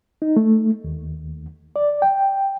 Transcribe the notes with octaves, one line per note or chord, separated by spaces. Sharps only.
D#4
A3
D#2
D5
G5